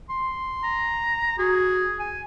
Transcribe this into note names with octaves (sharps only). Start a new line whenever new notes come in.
C6
A#5
F#4 G#4
G#5